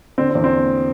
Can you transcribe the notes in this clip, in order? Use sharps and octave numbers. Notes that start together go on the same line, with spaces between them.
D3 C4
C4
E2
C4